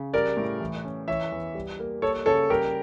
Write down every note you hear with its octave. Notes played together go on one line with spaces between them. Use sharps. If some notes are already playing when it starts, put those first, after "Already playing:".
Already playing: C#3
G3 A#4 D5
A2
E3
C#4
E3 C#5 E5
E2
G3
A#3
A#3 A4 C#5
C#3 A4 C#5
G3 G4 A#4